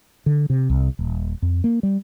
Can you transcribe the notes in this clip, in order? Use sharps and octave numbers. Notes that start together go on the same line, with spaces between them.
D3
C3
C2
D#1
F2
A#3
G3